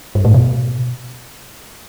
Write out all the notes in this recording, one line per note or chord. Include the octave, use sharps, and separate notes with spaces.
G2
A2
B2